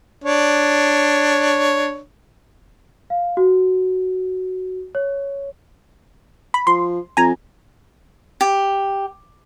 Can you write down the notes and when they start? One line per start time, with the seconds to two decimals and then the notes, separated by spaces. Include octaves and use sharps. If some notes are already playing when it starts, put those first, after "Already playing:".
0.24 D4 C#5
3.10 F5
3.37 F#4
4.95 C#5
6.54 B5
6.67 F3 C6
7.17 F2 G#5 A#5
8.41 G4